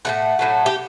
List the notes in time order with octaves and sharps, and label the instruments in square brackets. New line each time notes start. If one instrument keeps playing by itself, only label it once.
[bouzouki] A2 F#3 A3 F#5
A2 F#3 A3
G4